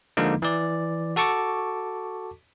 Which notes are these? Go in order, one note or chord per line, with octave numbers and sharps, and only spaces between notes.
D3 F3 G#3 A#3 D#4
E3 D5
F#4 A4 A5 C#6 D6